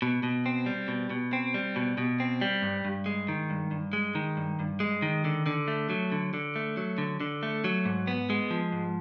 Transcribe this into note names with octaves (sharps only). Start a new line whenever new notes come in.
B2
B2
C4
G3
B2
B2
C4
G3
B2
B2
C4
G3
G2
G2
G#3
D#3
G2
G2
G#3
D#3
G2
G2
G#3
D#3
D3
D3
A3
F#3
D3
D3
A3
F#3
D3
D3
A3
F#3
G#2
B3
G#3
F3
G#2